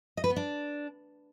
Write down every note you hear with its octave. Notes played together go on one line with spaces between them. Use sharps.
D#5
B4
B3
D4